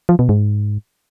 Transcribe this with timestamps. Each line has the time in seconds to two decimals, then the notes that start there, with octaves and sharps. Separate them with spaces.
0.09 F3
0.19 B2
0.29 G#2